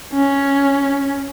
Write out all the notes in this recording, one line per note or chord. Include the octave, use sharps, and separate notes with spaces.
C#4